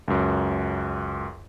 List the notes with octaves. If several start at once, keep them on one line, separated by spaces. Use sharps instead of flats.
C#2 F#2